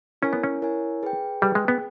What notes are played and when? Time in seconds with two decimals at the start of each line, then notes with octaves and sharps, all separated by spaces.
0.22 C#4 E4 A#4 C#5 G#5
0.33 B3
0.44 C#4
0.62 E4 A#4 C#5 G#5
1.03 G#4 B4 G5
1.42 G3 G#4 B4 G5
1.55 G#3
1.68 B3